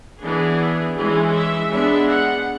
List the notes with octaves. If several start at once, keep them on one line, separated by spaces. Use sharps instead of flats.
E3 B3 D4 G#4
E3 G#3 C#4 G#4
E5
G#3 B3 D4 E5
F#5